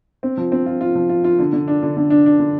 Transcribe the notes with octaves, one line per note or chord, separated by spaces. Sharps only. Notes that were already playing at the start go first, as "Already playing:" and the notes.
C4
F3
C4
F4
F4
F3
F4
F4
D3
D3
D4
D3
D3
D4
D4
D3